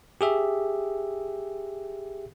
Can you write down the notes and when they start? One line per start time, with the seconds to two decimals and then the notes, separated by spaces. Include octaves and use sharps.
0.21 G4 G#4 E5